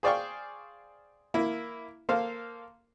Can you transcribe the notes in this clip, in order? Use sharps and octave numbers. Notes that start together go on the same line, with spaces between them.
G#4 C5 D5 F5 G5 C#6
A#3 E4
A#3 A4 C5 F5